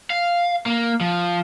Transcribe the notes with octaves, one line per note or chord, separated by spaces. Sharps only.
F5
A#3
F3